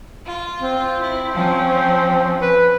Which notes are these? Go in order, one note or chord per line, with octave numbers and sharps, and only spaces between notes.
F4
C4
E4
F3 C#4
B4